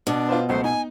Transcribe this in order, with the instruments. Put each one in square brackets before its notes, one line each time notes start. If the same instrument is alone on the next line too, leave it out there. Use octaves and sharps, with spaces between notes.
[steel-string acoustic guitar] B2 [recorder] D4
[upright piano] F4 B4 C5
[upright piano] C#2 F#3 A3 [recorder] C5
[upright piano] D#4 [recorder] G#5